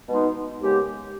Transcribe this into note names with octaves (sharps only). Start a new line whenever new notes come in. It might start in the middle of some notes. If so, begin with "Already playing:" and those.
B2 G#3 B3 D#4
D#2 C#3 G#3 B3 G4